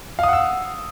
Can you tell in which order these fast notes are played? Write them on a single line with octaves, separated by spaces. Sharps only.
F5 D#6 F#5 E6